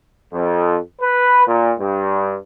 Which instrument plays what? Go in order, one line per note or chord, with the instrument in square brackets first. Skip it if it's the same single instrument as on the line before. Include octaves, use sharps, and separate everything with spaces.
[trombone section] F2
B4
A#2
G2